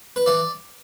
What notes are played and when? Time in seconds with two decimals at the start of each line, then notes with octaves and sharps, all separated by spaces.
0.16 B4
0.26 E3 D5